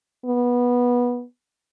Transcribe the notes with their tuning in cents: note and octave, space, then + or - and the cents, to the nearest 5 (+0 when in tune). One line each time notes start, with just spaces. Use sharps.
B3 -15